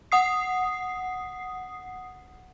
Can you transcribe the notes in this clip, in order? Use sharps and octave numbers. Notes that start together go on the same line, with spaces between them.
F#5 D#6 C7